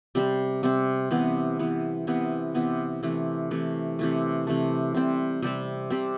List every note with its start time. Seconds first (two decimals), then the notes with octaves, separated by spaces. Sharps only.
0.15 C3 G3 C4
0.63 C3 G3 C4
1.11 C3 E3 B3
1.59 C3 E3 B3
2.07 C3 E3 B3
2.55 C3 E3 B3
3.03 C3 E3 A3
3.51 C3 E3 A3
3.99 C3 E3 A3
4.47 C3 E3 A3
4.94 C3 G3 C4
5.42 C3 G3 C4
5.90 C3 G3 C4